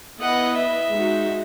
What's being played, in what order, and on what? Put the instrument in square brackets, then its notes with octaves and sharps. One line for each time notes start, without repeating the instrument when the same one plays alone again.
[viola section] B3 E4 B4 D#5 [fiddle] F#5
[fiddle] E5
[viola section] G#3 D#4 F#4